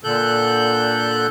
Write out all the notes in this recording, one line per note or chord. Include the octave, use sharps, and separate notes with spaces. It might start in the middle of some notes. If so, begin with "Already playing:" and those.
A#2 D3 A4 F#6 G6